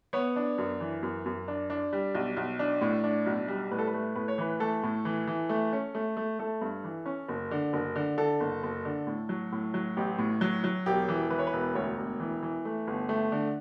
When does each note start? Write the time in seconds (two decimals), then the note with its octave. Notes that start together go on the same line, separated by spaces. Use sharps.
0.13 B3 C#5
0.36 D4
0.58 F#2
0.80 E3
1.03 F#2
1.26 F#2
1.48 D4
1.70 D4
1.93 G3
2.15 B1
2.37 B1
2.59 D4
2.81 A2
3.04 D4
3.26 B1
3.48 G3
3.71 A2 B4
3.79 A4
3.87 B4
3.93 A3
4.15 A2 B4
4.28 C#5
4.38 E3 B4
4.60 A3 A4
4.83 A2
5.05 E3
5.27 E3
5.49 A3
5.73 C#4
5.95 A3
6.17 A3
6.39 A3 A4
6.61 G2
6.84 E3
7.06 C#4
7.28 F#1
7.51 D3
7.73 F#1
7.96 D3
8.18 D3 A4
8.40 F#1
8.63 F#1
8.85 D3
9.07 A2
9.29 F#3
9.52 A2
9.74 F#3
9.97 A1 G4
10.18 A2
10.41 F#3
10.64 F#3
10.86 E1 G4
11.08 E3
11.30 E3 B4
11.39 C#5
11.47 B4
11.53 E1
11.75 D2 C#5
11.98 E1
12.20 E3
12.43 E3
12.65 A3
12.87 G1
13.09 A3
13.32 D3